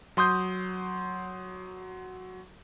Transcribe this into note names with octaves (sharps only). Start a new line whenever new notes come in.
F#3 C6 D#6 G6